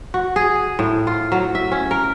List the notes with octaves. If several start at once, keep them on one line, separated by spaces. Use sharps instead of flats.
F#4
G#4
A2
F4
F#3
E5
C#4
A#4